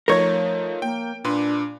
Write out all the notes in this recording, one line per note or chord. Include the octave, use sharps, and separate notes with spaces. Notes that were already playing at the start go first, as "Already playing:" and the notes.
F3 A3 D#4 A#4 C#5
A#3 G5
A#2 D4 B4 C6